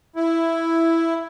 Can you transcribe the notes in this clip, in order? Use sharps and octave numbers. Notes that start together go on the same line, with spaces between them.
E4